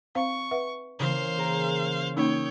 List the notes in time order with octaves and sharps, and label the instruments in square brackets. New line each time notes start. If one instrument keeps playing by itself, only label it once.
[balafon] C4 C5 F5 [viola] C#6
[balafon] B4 E5 F#5
[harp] C#3 E3 A#3 [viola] C5 F5
[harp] G#4 A#4 A#5
[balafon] A#3 C#4 D#4 [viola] C#5 G5 [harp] D#6 E6